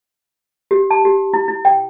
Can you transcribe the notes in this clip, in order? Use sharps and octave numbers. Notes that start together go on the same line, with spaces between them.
G4
A5
G4
E4
E4
G5